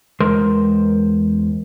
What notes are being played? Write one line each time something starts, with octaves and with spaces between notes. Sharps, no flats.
E2 G#3 A#4 C5 C6